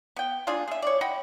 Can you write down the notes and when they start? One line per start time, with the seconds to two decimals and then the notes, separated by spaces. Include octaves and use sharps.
0.16 B3 G5
0.47 A#3 D4 F4 G#4
0.68 G#4 E5
0.82 C#5 D5
1.01 D#5 F#5 G5 B5